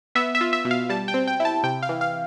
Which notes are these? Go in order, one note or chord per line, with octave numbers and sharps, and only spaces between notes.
B3 E5
E5
F4
E5
B2
F5
G3 A5
G5
C4
G5
E4
A5
C3 G5
F5
E3
F5